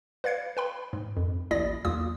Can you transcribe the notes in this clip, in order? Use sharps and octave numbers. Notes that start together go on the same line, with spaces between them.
B4 D5 F5 G#6 C7 C#7
B4 G5 B5
G#2
F2
A1 D#2 E4 D5 D#6 A#6
B1 E2 A#3 F4 D#6